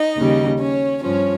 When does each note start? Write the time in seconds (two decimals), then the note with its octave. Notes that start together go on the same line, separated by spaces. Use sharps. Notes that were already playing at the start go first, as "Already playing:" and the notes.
Already playing: D#4 D#5
0.16 D#2 C#3 G3
0.59 C#4 C#5
1.02 G2 F3 C#4 C#5